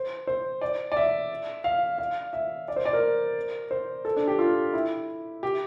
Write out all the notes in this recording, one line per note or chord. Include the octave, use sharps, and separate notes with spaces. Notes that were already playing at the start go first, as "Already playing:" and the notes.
Already playing: C5
C5
D5
D5
E5
F5
F5
E5
D5
C5
D5
A#4
C5
A4
D4
G4
F4
E4
G4